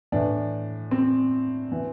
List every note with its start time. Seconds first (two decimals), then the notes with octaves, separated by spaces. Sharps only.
0.12 A2 E3 D4
0.91 C4
1.72 E3